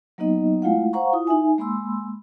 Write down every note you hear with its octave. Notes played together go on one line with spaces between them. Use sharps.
F#3 A#3 B3 D#4 D#5
G#3 A3 E4 F4 F5 F#5
C5 F5 F#5 A#5 C#6
E4 F4 D#6
D#4 E5 G#5
G#3 A#3 B5 C6 E6